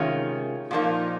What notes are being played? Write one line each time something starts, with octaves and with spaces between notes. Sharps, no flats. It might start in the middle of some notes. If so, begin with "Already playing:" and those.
Already playing: C3 D#3 G#3 C#4 F4
A#2 F3 A#3 D#4